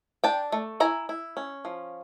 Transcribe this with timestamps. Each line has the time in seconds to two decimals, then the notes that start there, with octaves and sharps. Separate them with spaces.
0.24 D4 G5 A5
0.52 A3
0.80 E4 G#5 A#5
1.09 E4
1.37 C#4
1.65 F3